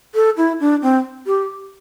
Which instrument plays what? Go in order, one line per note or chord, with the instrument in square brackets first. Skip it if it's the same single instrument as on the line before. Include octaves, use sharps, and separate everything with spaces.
[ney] A4
E4
D4
C4
G4